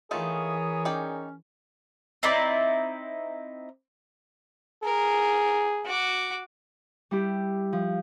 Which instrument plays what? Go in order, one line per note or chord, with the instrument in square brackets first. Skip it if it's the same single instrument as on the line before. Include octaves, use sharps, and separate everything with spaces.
[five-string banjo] D#3 A3 F4 [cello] E3 [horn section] G#4 A#4 C#5 [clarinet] D#6
[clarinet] C#4 [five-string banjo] D#4 D5 G5
[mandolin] C4 D#4 E4 D5
[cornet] G#4 [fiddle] A#4
[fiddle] F#4 D6
[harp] G3 E4 G4
F3